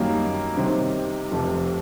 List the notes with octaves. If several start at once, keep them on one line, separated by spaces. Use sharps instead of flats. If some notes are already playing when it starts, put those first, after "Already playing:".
Already playing: F#2 D#3 G3 A#3 C#4
C3 D#3 G3 C4
F1 F2 C3